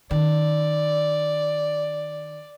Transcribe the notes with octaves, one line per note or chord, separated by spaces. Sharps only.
D#3 D5